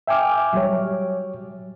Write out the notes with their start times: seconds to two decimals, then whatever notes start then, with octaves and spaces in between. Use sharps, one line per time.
0.07 E5 G5 G#5 D6 F6
0.53 F#3 G3 C#5